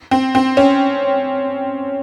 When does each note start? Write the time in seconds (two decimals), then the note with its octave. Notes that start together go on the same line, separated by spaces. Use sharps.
0.11 C4
0.35 C4
0.57 C#4